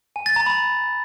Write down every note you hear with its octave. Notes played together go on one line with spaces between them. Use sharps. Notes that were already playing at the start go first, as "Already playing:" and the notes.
G#5
A6
A#5
B5